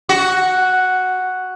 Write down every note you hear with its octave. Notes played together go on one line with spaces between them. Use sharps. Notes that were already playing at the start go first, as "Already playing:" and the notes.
F#4